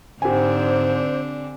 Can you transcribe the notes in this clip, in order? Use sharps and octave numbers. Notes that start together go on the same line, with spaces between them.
G#2 D3 C4 D4 G4 C5 G#5